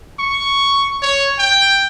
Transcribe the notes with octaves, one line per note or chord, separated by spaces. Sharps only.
C#6
C#5
G5